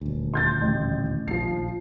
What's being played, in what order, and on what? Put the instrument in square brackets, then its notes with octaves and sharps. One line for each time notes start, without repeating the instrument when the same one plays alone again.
[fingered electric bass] D#1 D2
[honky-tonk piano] C6 G6 A6
A1
[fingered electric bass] A#1 D#2 [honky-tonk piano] F3 C7
[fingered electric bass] A#1